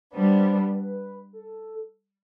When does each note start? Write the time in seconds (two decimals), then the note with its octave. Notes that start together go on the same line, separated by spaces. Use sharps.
0.12 G3 B3 D4 C5
0.73 B4
1.33 A4